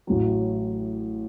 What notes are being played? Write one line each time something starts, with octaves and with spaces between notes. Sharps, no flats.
A1 A2 F#3